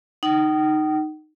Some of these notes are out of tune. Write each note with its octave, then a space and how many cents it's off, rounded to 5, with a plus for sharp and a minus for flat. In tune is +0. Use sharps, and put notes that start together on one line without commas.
D#4 -10 G5 -45